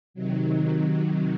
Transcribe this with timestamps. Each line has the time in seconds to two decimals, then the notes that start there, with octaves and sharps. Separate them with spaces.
0.14 C3 D#3 F#3